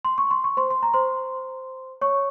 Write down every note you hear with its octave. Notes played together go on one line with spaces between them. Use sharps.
C6
C#6
C6
C#6
C5 C6
C6
A#5
C5 C6
C#5 C#6